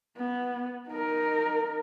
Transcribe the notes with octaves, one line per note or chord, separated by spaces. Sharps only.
B3
D#4 A#4